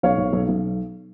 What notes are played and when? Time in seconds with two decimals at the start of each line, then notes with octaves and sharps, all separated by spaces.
0.03 B1 C#5 F5
0.18 B1
0.33 B1
0.49 B1